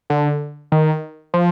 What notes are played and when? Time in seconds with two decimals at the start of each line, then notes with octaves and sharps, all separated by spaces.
0.10 D3
0.72 D#3
1.34 F3